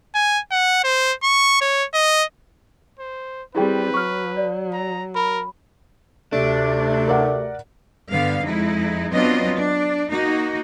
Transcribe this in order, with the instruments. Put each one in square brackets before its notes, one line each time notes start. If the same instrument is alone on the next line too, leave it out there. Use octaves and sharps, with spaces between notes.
[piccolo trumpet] G#5
F#5
C5
C#6
C#5
D#5
[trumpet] C5
[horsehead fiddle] G3 C4 [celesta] E4 G#4 G5 [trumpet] B4
[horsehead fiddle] F#3 [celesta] C#6 F6
[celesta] D5
[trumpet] A#5
[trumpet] A#4 [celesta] B5
[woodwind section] D2 C3 [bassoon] A3 [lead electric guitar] D4
[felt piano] A#4 D5 F#5
[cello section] G2 D3 B3 F5
F2 G#3 D#4 E4
F#3 B3 C4 D4 F4 D#5
D4
A#3 D#4 F#4